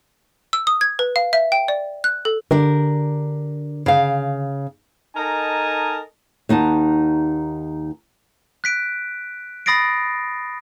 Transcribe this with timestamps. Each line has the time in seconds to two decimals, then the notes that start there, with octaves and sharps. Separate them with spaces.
0.53 E6
0.67 D#6
0.81 G#6
0.99 B4
1.16 F5
1.33 E5
1.52 G5
1.68 D5
2.04 F#6
2.25 A4
2.51 D3 D4 G4 A#4
3.86 C#3 F5
5.16 D#4 A4 A#4 D#5 G#5 A5
6.49 D#2 D#4 F#5 A5
8.64 F#6 B6 D7
9.66 B5 D#6 A6 A#6 C7 D7